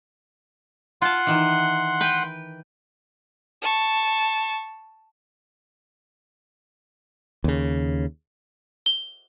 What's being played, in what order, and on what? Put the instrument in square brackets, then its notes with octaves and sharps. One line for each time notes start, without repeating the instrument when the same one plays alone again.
[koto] F4 A5 [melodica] F#5 C6
[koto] D#3 E3
B4 G5
[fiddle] A5 C#6
[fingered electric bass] D#2 C#3
[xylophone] G7